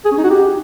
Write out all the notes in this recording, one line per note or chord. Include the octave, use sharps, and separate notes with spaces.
G#4
C#4
D#4
F#4
G4